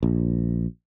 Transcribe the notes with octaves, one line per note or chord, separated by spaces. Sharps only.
A#1